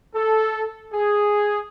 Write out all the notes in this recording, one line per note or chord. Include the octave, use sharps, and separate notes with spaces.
A4
G#4